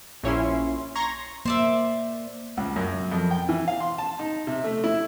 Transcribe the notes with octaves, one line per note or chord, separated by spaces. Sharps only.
A#1 C#4 E4 C6
A#5 C6 C#6 G#6 A#6
A#3 C5 D5 E5
C#2
F#2
F2
G5
E3
F5
C6
A5
D#4
C3
A3
E4